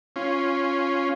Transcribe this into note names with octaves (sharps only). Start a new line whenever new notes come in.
C#4 F4